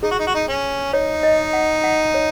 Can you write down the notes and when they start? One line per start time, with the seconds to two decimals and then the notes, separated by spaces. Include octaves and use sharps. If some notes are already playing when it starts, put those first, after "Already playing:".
0.03 D#4 G#4
0.11 F#4
0.19 D#4
0.27 F#4
0.35 D#4
0.48 C#4
0.93 D#4 C#5
1.23 D#5
1.53 F#5
1.84 F#5
2.14 C#5